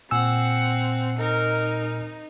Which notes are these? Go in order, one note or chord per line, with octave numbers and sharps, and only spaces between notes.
A#2 C4 F#5 G#5 E6
D#4 A#4